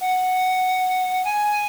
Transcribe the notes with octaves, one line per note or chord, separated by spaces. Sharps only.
F#5
G#5